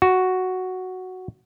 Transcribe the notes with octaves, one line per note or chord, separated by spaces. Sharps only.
F#4